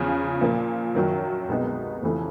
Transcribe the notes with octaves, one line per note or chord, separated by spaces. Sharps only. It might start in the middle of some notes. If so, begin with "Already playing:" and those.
Already playing: E2 C#3 F3
A#2 F3 A#3
F#2 D#3 F#3
C2 B2 G#3 B3 D#4
F1 F2 C#3 E3 A3